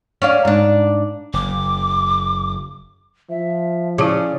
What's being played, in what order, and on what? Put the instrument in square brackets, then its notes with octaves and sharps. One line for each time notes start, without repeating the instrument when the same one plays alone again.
[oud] C#4 D4 F5
G#2 D4
[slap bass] F#1 [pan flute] D6
[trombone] F3 [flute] E5
[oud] C#3 [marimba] E4 A5 D6 [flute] D5